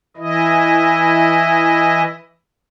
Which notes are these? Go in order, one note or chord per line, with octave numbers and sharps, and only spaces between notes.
E3 E4 D#5